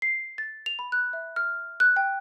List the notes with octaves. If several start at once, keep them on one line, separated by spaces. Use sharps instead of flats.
C7
A6
F7
B5
F#6
E5
F6
F#6
G5